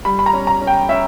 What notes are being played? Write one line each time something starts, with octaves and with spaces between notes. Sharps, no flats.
G3 B5
B5
A#5
C#4
A#5
C#4
G5
C#4 E5